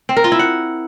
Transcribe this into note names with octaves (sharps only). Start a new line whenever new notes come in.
C4
A#4
F4
E4
F#5